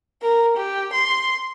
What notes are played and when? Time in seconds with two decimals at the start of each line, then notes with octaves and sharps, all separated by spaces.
0.22 A#4
0.56 G4
0.93 C6